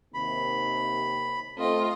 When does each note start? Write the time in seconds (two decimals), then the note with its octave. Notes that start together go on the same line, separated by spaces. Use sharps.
0.14 D#2 C3 B5
1.58 A3 C4 F4 D#5